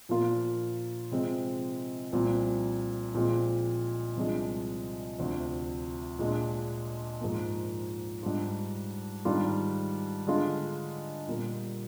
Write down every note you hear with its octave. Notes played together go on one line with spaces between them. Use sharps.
A#2 F3 A#3 F4
C3 F3 G#3 C4
C2 A#2 F3 C4
A#2 F3 G#3 C4
C2 C3 F3 G#3 D4
D2 C3 F3
A#2 G#3 D4
G#2 F3 A#3
G#2 G3 D4 F4
G#2 D#3 G3 D4 F4
D3 G#3 D4 F4
A#2 G3 A#3